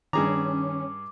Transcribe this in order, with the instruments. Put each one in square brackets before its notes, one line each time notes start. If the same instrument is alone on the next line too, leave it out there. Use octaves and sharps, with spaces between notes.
[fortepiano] G2 G#4 A#5 [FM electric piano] D#3 [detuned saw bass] C#4 [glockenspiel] D6